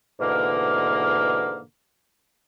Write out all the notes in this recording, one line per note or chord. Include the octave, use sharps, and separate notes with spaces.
G#2 B2 D3 E3 A#3